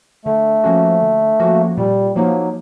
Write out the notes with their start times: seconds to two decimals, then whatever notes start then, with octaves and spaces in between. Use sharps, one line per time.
0.25 D3 A3
0.64 F3 A#3 C#4 F#4
1.02 D3
1.40 F3 A#3 C#4 F#4
1.77 A#2 G3
2.15 F3 F#3 A#3 D#4